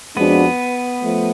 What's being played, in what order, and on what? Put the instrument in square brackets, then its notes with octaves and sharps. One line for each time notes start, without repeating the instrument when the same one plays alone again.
[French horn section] F2 F3 G#3 D4 F#4 [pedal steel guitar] B3 B4
[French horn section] F3 A3